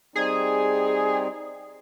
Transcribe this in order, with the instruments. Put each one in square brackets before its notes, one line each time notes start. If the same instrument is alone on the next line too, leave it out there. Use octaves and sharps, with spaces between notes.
[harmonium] G3 C4 D#4 [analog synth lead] G#4